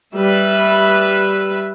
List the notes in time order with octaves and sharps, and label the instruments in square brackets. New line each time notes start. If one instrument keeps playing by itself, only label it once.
[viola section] G3 B4 E5